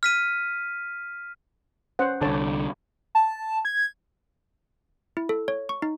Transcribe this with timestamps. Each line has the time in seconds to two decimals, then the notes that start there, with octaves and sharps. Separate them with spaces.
0.03 F6 B6 D#7
1.99 C#4 C5 F#5
2.22 C2 D3 C#5 A5
3.15 A5
3.65 G#6
5.17 E4
5.29 A4
5.48 C#5
5.69 C#6
5.82 D#4